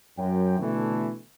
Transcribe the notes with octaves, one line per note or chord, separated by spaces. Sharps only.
F#2 G5
B2 D3 E3 A3